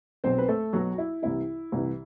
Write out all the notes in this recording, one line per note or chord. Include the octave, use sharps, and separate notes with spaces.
B1 B2 F#3 C4 C5
B4
A3 A4
B1 B2 F#3 F#4
E4
C2 C3 E3 E4
C2 C3 E3